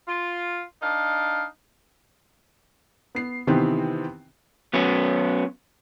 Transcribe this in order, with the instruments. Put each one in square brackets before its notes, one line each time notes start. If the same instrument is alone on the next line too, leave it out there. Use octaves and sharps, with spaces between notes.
[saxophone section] F4
D4 D#4 F5
[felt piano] B3 C7
C3 D#3 E3 B3 C4
[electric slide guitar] F#3 B3 C#4